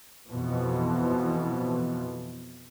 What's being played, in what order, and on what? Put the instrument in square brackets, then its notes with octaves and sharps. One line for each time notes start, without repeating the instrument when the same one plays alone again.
[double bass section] F2 B2 E3 F3